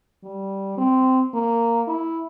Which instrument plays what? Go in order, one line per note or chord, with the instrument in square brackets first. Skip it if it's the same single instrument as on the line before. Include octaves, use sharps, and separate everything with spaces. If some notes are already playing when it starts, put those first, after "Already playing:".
[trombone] G3
C4
A#3
E4